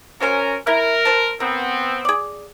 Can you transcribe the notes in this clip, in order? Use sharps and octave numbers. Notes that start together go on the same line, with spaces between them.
C#4 F#4 A#4 C5 G#5
E4 A#4
C5 A5
B3 C4 A#4
G#4 D5